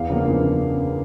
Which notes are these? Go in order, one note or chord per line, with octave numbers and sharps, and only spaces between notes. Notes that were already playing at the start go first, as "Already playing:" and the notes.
Already playing: E2 F5
C#3 F3 A#3 D4
E2
C#3